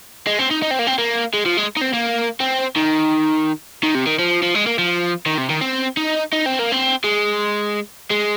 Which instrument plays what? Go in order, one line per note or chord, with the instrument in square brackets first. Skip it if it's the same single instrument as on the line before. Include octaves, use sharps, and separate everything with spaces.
[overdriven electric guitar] G#3
C4
D#4
D#4
C4
A#3
C4
A#3
G#3
F3
G#3
D#4
C4
A#3
C4
D#3
D#3
C3
D#3
F3
F3
G#3
A#3
F3
D#3
C3
D#3
C4
D#4
D#4
C4
A#3
C4
G#3
G#3